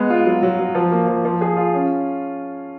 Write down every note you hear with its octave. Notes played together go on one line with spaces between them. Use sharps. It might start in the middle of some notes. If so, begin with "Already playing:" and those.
Already playing: G#3 B3
F4
F#3
F#3
F#3
F3
A#3
F3
F3
G#4
F4
C#4